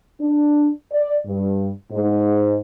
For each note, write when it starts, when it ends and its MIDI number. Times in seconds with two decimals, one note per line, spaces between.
0.20 0.70 62
0.92 1.18 74
1.26 1.69 43
1.91 2.57 44